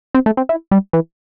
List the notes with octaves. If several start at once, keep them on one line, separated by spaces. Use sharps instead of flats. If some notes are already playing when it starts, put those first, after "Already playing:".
C4
A3
C4
E4
G3
E3